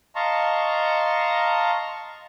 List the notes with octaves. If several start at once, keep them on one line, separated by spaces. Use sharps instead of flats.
D#5 F5 A5 A#5 C6 C#6